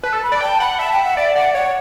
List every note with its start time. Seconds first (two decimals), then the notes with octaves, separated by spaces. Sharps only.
0.03 B4 A5
0.13 A4
0.23 B5
0.32 D5
0.41 G5 A5
0.60 F#5 B5
0.79 E5 A5
0.92 G5
1.04 F#5
1.17 D5 E5
1.35 D5 F#5
1.54 C#5 F#5